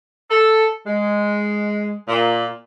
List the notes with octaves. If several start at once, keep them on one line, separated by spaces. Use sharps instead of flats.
A4
G#3
A#2